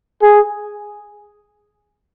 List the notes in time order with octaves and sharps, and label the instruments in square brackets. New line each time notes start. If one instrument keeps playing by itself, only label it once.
[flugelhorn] G#4